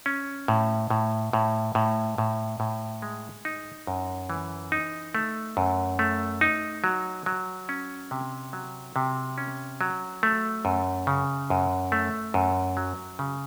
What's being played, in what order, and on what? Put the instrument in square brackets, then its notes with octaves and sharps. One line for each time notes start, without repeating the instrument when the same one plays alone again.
[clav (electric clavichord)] C#4
A2
A2
A2
A2
A2
A2
G#3
D#4
F#2
E3
D#4
A3
F#2
A3
D#4
F#3
F#3
C#4
C3
F#3
C3
C#4
F#3
A3
F#2
C#3
F#2
A3
F#2
F#3
C#3